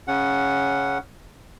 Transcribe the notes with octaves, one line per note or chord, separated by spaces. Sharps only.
C#3 C#4 F#5